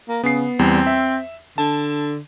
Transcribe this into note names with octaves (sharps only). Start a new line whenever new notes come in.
A#3
C#3 B3 C7
E2 G3 C4
E5
D3 A5